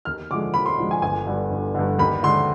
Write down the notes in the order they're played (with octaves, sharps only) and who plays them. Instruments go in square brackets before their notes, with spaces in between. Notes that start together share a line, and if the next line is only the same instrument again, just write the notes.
[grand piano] D#2 F6
D3 F3 G#3 D6
D#2 B5
C6
D3 F3 G#3
G#5
G1 G#5
G2 D3
G1
G2 D3
D#2 B5
D3 G#3 C6